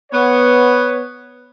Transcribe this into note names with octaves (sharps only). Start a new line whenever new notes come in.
B3 C#5